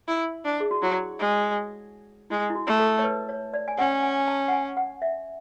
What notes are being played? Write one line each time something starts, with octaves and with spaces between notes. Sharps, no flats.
E4
D4
G#4
F#4
F#3 E4
G#3
G#3 E4
E4
F#4
A3
A4
C#5
B4
C#5
D5
G#5
C#4 F#5
G#5
A5
F#5
G#5
F#5
E5